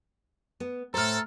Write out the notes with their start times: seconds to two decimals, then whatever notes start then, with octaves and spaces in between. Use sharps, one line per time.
0.60 B3
0.94 A2 A4 C5 A#5 F6